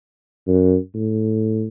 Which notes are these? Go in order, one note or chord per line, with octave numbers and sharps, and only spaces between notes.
F#2
A2